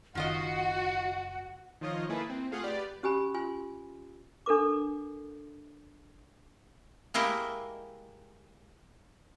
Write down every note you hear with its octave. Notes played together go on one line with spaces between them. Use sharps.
F#1 D#3 F4 F#4 D#5 F#5
D#3 F3 F4 C#5 D#5
A#3 E4 G#4 A4 B4
C4
A3 F4 G#4 F5 F#5
G4 B4 D5
C#4 G4 G#5 B5
F4 G#5 C6
D4 A4 A#4 D6
G#3 A#3 E4 G4 D#5